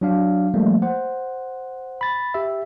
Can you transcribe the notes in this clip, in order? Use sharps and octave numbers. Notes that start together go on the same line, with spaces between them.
F#3 D4 F5
F3 G3 A3 A#3
C5 F#5
B5 A6
G4 E5